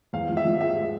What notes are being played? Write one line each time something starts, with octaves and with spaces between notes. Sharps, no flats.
E2 F5
F3
E5
F3
G#3 E5
G#3